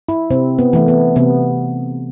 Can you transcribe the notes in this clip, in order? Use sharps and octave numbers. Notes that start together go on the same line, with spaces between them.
E4
C3 C4
B3
E3 A3
B3
C3 B3